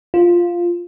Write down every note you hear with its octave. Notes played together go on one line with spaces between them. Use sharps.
F4